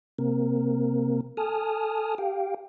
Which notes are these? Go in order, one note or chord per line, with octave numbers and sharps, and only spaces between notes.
C3 A#3 C4 A#4
A4 G#5 A5 D#6 F6
G4 F5 G5